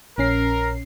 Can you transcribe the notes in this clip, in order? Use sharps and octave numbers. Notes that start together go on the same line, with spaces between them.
A#1 C#4 A#4 C7